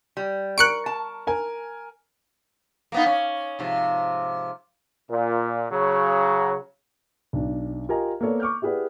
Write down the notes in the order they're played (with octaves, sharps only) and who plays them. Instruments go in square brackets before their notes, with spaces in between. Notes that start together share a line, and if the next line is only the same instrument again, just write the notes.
[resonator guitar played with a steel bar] G3
[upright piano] A#4 C#6 [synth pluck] F#6 C#7 D7
[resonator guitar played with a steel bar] A5
[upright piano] A#4 G#5
[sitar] A#3 B3 D#4
C#4
G#2 C3 F3
[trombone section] A#2
C#3 F#3
[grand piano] B1 D4
F4 G4 A#4 D#5 G#5 A#5
A#3 B3 A4 C#5 D5
C#6 D6 F6 G6
E4 G4 G#4 B4 D5 F#5